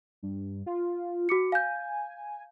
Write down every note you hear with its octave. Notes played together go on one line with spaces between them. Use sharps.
G2
F4
F#4 D6 C#7
F5 G#5 G6